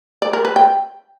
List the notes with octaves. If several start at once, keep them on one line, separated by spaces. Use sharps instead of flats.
D5
A#4
B4
G5